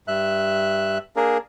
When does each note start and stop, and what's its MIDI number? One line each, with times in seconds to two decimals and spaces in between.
0.08 0.98 43
0.08 0.98 76
0.08 0.98 90
1.16 1.38 58
1.16 1.38 62
1.16 1.38 68
1.16 1.38 70